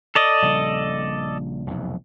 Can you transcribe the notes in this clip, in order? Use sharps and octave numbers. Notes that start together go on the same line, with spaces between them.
A4 D5 D#5
A#1 C#3 G3
F1 B1 E2